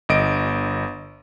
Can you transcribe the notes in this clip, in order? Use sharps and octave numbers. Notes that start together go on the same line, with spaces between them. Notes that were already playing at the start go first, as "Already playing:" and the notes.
G1 D#5 D7